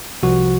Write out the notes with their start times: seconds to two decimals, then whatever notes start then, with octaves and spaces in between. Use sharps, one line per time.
0.23 C2 C3 F3 F#4